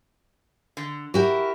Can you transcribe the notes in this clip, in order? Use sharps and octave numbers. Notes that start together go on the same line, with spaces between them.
D3
E4 F#4 G4 A#4